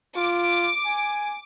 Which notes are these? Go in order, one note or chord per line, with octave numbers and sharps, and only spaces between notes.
F4 D6
G#5